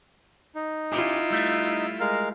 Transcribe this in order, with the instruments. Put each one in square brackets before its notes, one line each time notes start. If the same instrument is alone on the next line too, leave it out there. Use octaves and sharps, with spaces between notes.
[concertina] D#4
[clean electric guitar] C#4 G4 [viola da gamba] E4 F4
[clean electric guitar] G3 A3
[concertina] G#3 A#4 F5